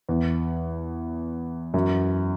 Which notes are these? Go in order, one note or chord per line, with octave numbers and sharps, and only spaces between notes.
E2
F#2